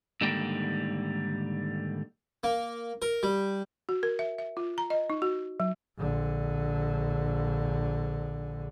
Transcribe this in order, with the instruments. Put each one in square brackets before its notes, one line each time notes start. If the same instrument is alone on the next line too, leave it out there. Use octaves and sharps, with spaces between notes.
[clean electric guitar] G#2 D3 D#3 G3 A#3 G5
[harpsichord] A#3
A#4
G3
[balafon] F#4
A#4
E5
E5
F4
A#5
D#5
D#4
F#4
F#3
[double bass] A#1 D3